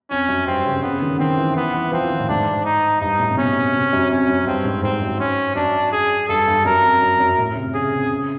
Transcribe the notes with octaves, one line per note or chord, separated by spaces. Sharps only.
F2 C#4
F#2
G2 C4
C#3
C#3 B3
D#3
D#3 C4
E3
E3 B3
E3
F3 C4
E3
D#3
A2
G#2 D4
D#4
G2 D#4
A2
C3
B2 C#4
C3
F#2
F2 C#4
F#2
G2 C4
G#2
G#2 C4
F#2
C#4
F#2 D4
G#4
G2 A4
G2
F#2 A#4
F2
F#2
F#2
A2
C3
C#3 G#4
C3
C#3